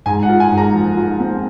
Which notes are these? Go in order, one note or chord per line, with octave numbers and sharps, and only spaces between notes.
G#2 G#5
F#5
F4
G#5
G#2
A#5
F3
F4
C4